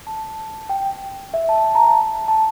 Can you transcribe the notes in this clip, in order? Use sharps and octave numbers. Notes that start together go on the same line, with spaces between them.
A5
G5
E5
A5
A5
A#5
A5
A5